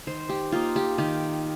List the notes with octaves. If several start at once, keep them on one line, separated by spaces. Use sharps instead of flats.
D#3 C5
G4
A#3 D#4 F4
G4
D#3 G4